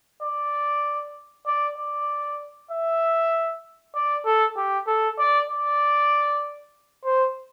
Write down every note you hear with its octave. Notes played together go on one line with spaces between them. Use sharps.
D5
D5
D5
E5
D5
A4
G4
A4
D5
D5
C5